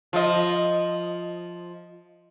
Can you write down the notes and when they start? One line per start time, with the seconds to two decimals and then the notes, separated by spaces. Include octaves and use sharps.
0.13 F3 F4 D#5